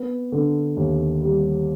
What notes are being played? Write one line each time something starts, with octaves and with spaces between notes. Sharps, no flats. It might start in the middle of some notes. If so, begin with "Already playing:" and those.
Already playing: B3
D3
D#2
G3